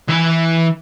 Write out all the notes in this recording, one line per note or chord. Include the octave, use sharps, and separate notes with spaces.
E3 E5